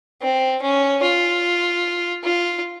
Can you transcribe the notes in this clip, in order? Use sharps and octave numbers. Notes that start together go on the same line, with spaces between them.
C4
C#4
F4
F4